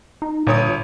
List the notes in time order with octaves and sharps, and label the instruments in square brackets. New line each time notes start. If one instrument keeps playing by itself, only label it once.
[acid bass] D#4
[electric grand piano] G1 C#5 D#6 [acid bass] A#2